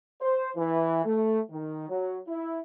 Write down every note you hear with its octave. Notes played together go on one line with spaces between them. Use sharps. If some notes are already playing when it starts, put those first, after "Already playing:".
C5
E3
A3
D#3
F#3
E4